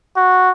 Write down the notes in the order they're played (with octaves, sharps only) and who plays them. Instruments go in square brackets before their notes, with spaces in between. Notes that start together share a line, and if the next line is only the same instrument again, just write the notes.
[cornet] F#4